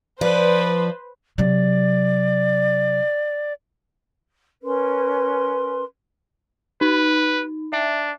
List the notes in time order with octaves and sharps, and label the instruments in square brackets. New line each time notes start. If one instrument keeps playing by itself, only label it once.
[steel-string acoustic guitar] F3 D5 [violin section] B4 C5
[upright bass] C3 F#3 [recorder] D5
[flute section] C#4 A#4 B4 C6
[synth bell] D#4 [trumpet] B4
[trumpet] D4 [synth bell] E5